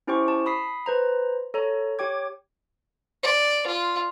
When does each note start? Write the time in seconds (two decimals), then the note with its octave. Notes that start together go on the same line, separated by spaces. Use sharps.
0.07 C#4 E4 G4 C5 G5 C#6
0.28 A5
0.46 B5 D#6 B6 C7
0.86 B4 C5 A#5
1.54 A4 C#5 A#5
1.99 G4 C#5 G5 D6 G#6
3.23 D5
3.67 F4